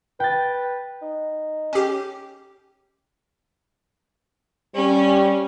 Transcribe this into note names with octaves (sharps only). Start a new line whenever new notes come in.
B4 G5 A6
D#4
C#4 G4
G3 C#4